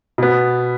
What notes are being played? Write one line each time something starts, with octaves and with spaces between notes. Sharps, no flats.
B2 B3